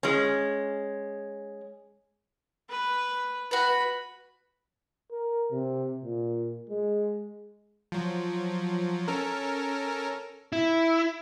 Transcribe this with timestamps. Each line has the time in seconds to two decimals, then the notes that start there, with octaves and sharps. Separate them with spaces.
0.03 G#3 C#4
2.70 B4
3.51 F#4 B4 B5
5.12 A#4
5.51 C3
6.04 A#2
6.70 G#3
7.92 F3 F#3
9.08 C#4 A4 A#4
10.52 E4